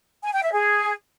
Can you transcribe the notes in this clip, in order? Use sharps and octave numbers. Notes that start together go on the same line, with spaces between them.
G#5
G5
E5
G#4